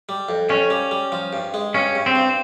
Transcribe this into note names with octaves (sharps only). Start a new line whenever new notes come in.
G3
F2
F2 C#4
G3
G3
F3
G2
G#3
G2 C#4
G2
C4
G2